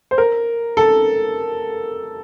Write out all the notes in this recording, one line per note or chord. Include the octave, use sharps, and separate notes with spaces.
C5
A#4
A4